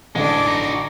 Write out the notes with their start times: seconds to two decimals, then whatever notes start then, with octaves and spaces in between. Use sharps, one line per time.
0.15 A1 D3 G#3 D4 A4 D6
0.47 D#4 F#4